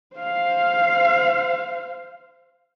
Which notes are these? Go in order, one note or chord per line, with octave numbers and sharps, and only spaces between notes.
C5 F5